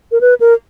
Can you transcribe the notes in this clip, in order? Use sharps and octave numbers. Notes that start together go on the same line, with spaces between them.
A#4
B4
A#4